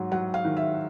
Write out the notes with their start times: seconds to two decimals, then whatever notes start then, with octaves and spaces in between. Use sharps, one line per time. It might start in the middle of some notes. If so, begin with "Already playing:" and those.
Already playing: G#2 F#3
0.12 F#3 F#5
0.34 F5
0.45 D#3
0.57 E5